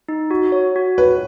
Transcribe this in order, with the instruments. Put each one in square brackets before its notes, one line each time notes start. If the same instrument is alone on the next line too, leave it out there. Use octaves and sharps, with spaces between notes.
[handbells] D#4
F#4
C#5
F#4
[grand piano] B4 [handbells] C#5